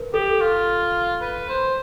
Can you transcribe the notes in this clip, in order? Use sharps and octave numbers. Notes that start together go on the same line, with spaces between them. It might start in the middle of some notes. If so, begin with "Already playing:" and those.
Already playing: A#4 B4
G4 A4
F4
B4
C5